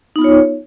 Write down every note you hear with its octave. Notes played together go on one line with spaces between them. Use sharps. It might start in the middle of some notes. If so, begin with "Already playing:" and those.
B3 D#4 F4 C#5